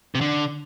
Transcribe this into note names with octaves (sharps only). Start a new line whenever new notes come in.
C3
D3